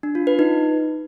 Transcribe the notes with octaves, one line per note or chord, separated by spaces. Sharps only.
D4
F4
B4
D#4